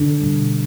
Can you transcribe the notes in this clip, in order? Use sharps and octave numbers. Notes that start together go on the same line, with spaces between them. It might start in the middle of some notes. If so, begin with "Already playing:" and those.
Already playing: D3 D4
B2 G3